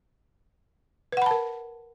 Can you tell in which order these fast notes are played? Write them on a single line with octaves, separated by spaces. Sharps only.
B4 F#5 B5 A5 A#4